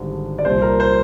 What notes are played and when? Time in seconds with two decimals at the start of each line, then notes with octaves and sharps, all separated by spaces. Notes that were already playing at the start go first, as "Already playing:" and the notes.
Already playing: G#1 G2 D3
0.38 D5
0.45 C2 A#2 F3 C5
0.62 A#4
0.80 C5